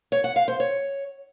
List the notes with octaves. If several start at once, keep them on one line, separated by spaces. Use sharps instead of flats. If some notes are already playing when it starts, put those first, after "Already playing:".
C#5
F#5
F5
C5
C#5